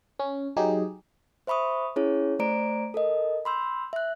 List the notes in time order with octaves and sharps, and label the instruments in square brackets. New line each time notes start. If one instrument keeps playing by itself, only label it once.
[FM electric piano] C#4
F#3 D#4 G4 G#4
[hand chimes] C5 E5 B5 C#6 D#6
C#4 E4 G#4 C#5
A3 C5 D5 A#5 D7
A4 A#4 D#5
B5 C6 E6 G6
E5 F#6